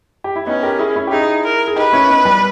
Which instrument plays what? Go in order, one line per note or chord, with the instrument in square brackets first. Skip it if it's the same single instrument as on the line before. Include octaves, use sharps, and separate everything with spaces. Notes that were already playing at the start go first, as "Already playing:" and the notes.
[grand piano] G4
E4
[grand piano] B3 D#4 [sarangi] C#4
[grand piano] G4 A#4
E4 G#4
C#4 E4
G4
[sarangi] D#4 [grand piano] E4 G#4
[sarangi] A#4
[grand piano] G#4
[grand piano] D#4 G4 [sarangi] B4
[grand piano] C#4 E4
B3 D#4
G3